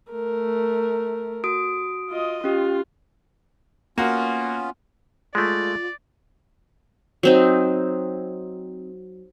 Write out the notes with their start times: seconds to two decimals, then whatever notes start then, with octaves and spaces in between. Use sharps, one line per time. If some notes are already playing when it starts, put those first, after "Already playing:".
0.12 A3 A#4
1.44 F#4 D#6 D7
2.10 F4 D#5
2.44 C#4 F4 G4
3.98 A#3 B3 C#4 F4 F#4
5.35 G#3 A3 F4 D5
7.23 F#3 C4 D#4